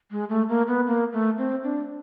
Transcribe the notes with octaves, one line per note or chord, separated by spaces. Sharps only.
G#3
A3
A#3
B3
A#3
A3
C4
D4